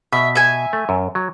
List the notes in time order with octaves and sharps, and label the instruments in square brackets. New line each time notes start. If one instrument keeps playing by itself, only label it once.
[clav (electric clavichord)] B2 [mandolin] E5
[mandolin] E5 G#5
[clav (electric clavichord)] A3
F#2
F#3